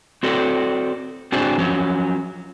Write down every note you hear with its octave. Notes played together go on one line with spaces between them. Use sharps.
C4 F#4 A4 D5
C4 D4 F#4 G#4 C5 D5
F3 F#3 C#4